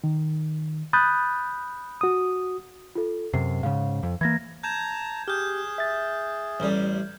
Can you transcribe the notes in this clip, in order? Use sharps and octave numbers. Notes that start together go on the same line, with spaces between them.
D#3
B5 D#6 F#6 G6 A6
F#4 D#6
F4 A4
F#2 C3 C7
G#2 C#3 F5
F2
E3 A#3 G#6 A#6
A5 A#5 G6 G#6 E7
G4 G#4 F6 G6
E5 A6
A1 G3